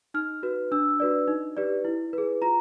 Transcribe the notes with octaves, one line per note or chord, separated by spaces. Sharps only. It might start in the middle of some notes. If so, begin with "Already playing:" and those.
D#4 F6
F#4 B4
D4 E6
F#4 B4 D5
D#4
G4 B4 D5
E4
G#4 B4
F4 A#5